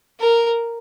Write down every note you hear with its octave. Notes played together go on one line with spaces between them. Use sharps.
A#4